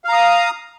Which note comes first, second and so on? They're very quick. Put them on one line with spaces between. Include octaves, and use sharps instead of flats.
F5 A#5 D#6